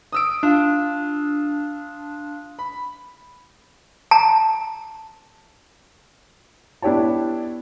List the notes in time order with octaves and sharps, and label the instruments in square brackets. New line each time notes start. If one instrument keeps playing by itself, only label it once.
[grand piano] D#6 E6 D7
[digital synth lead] D4 [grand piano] F4
[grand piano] B5
[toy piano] A5 A#5
[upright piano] B3 D4 E4 G4 C#5 A5